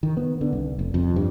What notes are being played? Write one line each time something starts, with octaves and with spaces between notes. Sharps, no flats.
D#3
B3
D3
C2
F1
F2
G2